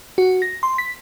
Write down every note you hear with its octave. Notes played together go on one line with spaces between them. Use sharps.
F#4
A#6
C6
B6